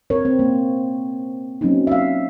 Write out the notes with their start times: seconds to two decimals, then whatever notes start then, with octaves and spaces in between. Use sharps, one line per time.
0.10 C4 A#4 C#5
0.25 C4
0.39 A#3
1.61 F#3 A#3 C4 C#4 D#4
1.87 E5 F5